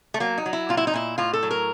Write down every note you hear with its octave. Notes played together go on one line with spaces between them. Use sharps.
A3
F#3 A#3
D#4
F#3
E4
A#2 F4
E4
D#4
A#2 E4
A2 F4
A4
F#3
A#4